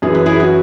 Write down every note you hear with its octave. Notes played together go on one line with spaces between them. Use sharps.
F#2 E3 G#4
B4
E4 G#4
F#4 B4